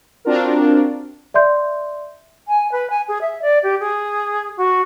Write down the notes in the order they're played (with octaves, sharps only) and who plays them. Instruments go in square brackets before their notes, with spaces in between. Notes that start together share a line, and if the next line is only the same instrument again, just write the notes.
[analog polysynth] C4 D4 F4 F#4 A#4
[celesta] D5 E5 C6 G6
[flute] G#5
B4
G#5
G#4
E5
D5
G4
G#4
F#4